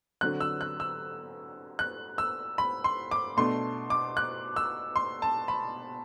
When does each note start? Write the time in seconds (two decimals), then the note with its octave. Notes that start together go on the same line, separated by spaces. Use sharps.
0.21 D3 F#3 C4 F#6
0.41 E6
0.61 F#6
0.80 E6
1.79 F#6
2.18 E6
2.58 B5
2.84 C6
3.11 D6
3.37 B2 A3 D4 C6
3.90 D6
4.17 F#6
4.56 E6
4.96 C6
5.22 A5
5.48 B5